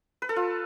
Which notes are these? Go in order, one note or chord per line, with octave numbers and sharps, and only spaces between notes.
B4
A4
F4